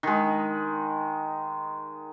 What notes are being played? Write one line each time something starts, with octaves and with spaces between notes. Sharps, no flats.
D#3 G#3